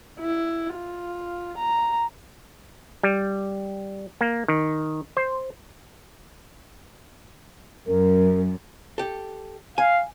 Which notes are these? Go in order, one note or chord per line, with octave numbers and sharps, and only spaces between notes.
E4
F4
A#5
G3
A#3
D#3
C5
F#2 A#4
G4 A4
F5 G#5